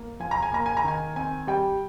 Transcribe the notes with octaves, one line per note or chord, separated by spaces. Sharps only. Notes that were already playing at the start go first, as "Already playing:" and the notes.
Already playing: A#3
F3 G#5
A#5
G#5
A#3 A#5
G#5
A#5
D#3 G#5
C4 G#5
G3 G5